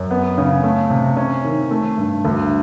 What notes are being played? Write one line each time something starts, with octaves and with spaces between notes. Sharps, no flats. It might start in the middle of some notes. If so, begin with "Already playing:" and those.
Already playing: F#2
B3
C#3
A3
C3
C#4
D#3
A3
G2
D2